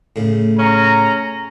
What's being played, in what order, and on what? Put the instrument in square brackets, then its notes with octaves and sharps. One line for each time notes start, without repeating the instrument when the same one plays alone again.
[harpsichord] A2 C#3
[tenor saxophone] C#4 [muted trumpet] A#5